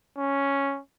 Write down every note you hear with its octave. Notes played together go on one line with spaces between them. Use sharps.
C#4